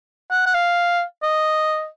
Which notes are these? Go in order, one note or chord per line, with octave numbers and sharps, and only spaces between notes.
F#5
F#5
F5
D#5